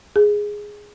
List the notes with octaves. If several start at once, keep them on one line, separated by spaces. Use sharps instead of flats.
G#4